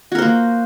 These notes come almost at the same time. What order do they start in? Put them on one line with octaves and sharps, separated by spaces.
F#4 A#4 C5 A#3